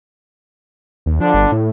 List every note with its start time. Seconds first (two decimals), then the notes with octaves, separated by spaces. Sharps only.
1.06 D#2
1.20 D3 F3 D4
1.34 G1
1.52 A2